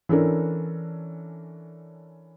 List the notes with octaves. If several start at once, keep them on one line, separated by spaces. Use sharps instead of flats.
E3 C#4 D4 A4 A#4